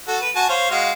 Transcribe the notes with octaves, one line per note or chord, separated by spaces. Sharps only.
F#4 A4
B4
F#4 G#5 A5
C5 C#5 F5
G#3 F#4 F5